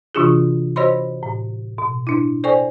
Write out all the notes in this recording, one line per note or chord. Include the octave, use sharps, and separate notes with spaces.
C3 E3 D4 F4 F#4 G#4
F#4 C5 C#5 D#5 B5 C6
A2
B2
D4 E4
A4 C5 D5 G5 G#5 C#6